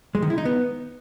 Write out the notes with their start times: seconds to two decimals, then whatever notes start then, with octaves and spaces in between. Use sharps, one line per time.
0.15 G#3
0.22 D#3
0.30 E4
0.38 D#4
0.45 B3